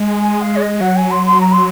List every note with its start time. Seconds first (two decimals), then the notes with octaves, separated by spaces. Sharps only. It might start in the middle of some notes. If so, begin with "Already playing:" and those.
Already playing: G#3
0.21 G#5
0.41 F5
0.56 C#5
0.61 D#5
0.80 F#3 F#5
0.96 G#5
1.11 C6
1.26 C6
1.40 A#5
1.52 C6